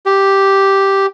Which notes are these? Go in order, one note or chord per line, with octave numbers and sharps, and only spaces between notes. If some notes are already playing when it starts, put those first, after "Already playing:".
G4